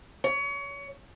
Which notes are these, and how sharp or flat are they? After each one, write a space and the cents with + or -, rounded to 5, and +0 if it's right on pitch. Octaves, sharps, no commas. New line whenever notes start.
C#5 +25